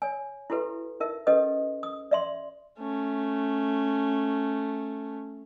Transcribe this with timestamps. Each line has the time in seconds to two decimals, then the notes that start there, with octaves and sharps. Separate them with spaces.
0.02 C#5 G#5
0.50 E4 F#4 G4 A4 B4 E5
1.00 D#4 A#4 E5
1.27 C#4 G4 A4 B4 D#5 D#6
1.83 D#6
2.11 D5 E5 C6
2.79 A3 C#4